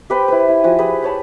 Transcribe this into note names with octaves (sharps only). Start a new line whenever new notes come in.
G4 B4 C5 G5
E4 B4
E4
F3 F#4 B4 G#5
G4 G#4 B4
B4 C#5 A5 B5